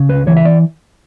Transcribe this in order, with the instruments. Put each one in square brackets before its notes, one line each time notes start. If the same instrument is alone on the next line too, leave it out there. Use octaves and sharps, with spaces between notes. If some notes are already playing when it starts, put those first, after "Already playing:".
Already playing: [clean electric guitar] C#3
C#2 B4
E3 C#5
E5
D5